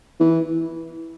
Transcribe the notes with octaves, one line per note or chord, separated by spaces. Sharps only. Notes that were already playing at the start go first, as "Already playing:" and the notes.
E3